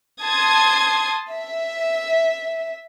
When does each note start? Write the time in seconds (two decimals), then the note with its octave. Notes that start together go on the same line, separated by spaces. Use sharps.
0.23 A5 C6 D#6 G#6
1.32 E5